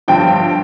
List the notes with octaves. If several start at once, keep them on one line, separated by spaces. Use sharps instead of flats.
G1 G2 D3 F3 G5